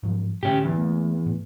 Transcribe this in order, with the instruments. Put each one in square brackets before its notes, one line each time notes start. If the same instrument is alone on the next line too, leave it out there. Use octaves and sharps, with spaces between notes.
[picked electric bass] G#2 F3 F#3
[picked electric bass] A2 D3 [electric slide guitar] C#4 G4
[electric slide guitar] E2
[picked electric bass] A3 A#3
A2